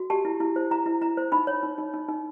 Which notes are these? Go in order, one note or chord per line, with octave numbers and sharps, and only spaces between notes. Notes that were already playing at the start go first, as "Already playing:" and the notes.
Already playing: F#4
G4 A5
E4
E4
C5
E4 A#5
E4
E4 A#5
C5
D#4 B5
C#5
D#4
D#4
D#4
D#4